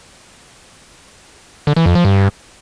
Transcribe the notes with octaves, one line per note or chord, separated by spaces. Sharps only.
D3
E3
F2
F3
G2